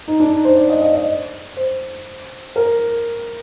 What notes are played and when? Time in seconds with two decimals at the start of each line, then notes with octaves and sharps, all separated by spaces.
0.08 D#4
0.20 D4
0.33 D#4
0.45 C5
0.57 D5
0.70 D#5
0.82 D#5
0.95 D#5
1.57 C5
2.56 A#4